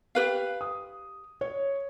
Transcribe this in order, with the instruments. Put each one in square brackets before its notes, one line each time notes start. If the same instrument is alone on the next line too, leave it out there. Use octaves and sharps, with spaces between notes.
[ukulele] G4 B4 F5
[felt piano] D#6
C#5